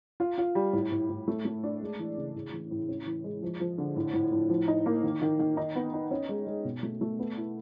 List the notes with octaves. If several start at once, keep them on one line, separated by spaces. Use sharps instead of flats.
F4
F4
G3
A2
A2
A2
A3
A3
D4
G#3
E3
C#3
A2
E3
A2
C#4
E3
G#3
F3
F3
D3
A2
A2
A2
F3
D#4
A#3
D#3
D#3
D#3
D#4
B3
D#4
C#4
G#3
G#3
B2
A3
A3
B3
E4